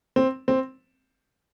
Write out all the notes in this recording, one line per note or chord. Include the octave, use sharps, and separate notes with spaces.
C4
C4